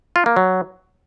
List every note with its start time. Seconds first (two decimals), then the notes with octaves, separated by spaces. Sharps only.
0.16 F4
0.26 A#3
0.36 F#3